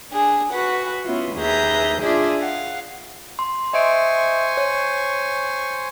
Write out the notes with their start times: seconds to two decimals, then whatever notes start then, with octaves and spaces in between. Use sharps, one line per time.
0.11 D4 G#4
0.51 F#4 B4 F#5
1.05 B3 C#4 E4 F4
1.37 D#2 G#4 B4 E5 A#5 G6
2.01 D4 F4 G#4 D5 E5
2.41 F5 F#5
3.39 C6
3.73 C5 D#5 E5 G#5 C#6 D7
4.57 C#5